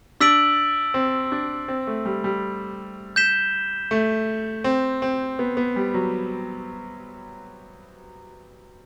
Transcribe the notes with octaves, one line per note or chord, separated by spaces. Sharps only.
D4 E6 B6 D7 F#7
C4
D4
C4
A3
G3
G3
G6 B6 E7 G7
A3
C4
C4
B3
B3
G3
F#3